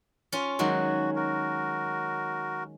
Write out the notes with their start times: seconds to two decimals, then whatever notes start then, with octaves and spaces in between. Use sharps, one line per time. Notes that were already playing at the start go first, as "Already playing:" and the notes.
0.32 C#4 F4
0.59 D#3 F#3 G#3 F#4
1.16 F#4 A#4